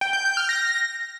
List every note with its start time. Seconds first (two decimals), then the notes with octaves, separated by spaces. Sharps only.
0.01 G5
0.13 G6
0.25 G6
0.37 F6
0.49 A#6